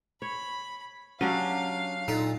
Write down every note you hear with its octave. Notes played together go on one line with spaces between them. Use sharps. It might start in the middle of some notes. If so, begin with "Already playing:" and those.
C#5 B5
F#3 C#4 D4 G4 C#5 F5
A#2 D#4 A4